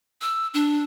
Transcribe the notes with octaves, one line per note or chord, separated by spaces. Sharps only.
E6
D4